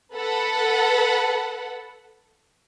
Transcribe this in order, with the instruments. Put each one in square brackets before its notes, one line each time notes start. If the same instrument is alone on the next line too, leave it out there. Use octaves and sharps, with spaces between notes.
[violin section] A4 B4 F#5